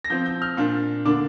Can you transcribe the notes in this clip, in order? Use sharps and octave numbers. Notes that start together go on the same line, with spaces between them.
A#6
F3 C4 G6
G6
F6
A#2 A#3 D4
D3 A#3 D4 D6